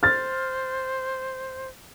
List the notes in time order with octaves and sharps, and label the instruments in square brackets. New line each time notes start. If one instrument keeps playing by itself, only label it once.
[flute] C5 [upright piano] F6 A6